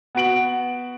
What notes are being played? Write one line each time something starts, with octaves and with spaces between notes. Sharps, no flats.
B3 F#4 D7 F#7